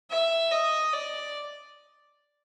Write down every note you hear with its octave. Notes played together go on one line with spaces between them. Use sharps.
E5
D#5
D5